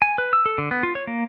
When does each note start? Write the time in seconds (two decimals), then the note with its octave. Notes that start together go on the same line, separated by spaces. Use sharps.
0.02 G#5
0.18 B4
0.33 E6
0.46 A4
0.58 D3
0.71 B3
0.83 F4
0.95 C#5
1.07 A#3